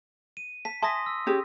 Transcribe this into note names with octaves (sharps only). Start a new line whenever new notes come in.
D#7
A5 B6
E5 G#5 A5 C6 D#6 A#6
E6
C#4 G4 G#4